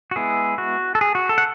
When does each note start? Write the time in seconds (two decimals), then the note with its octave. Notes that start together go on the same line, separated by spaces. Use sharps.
0.11 F#4
0.16 G#3 B3 E4 G#4
0.58 F#4
0.95 A4
1.01 G#4
1.15 F#4
1.29 A4
1.38 F#5